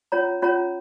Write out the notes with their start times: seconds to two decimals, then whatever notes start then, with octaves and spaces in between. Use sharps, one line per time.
0.12 C#4 F4 C#5 A#5
0.42 C#4 F4 C#5 A#5